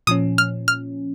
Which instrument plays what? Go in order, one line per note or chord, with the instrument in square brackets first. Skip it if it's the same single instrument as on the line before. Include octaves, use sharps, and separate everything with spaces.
[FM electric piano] A#2 F3 C#4 [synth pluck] D#6
[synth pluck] F6
F6